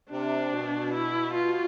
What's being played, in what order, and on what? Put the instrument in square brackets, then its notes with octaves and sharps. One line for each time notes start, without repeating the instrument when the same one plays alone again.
[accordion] C3 [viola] D4
[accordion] B2
[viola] E4
F4